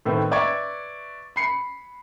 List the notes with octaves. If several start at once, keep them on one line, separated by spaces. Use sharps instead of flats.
A2 D#3 A3 B3 C4
B4 D5 E5 C#6 G#6
B5 C7 C#7